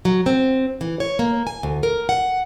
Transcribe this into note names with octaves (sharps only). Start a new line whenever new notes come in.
F#3
C4
E3
C#5
A#3
G#5
D2
A#4
F#5